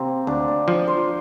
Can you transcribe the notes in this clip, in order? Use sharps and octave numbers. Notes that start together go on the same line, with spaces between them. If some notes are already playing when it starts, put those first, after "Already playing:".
Already playing: C3 A#3 C4
D2 D4
D4
F3
C5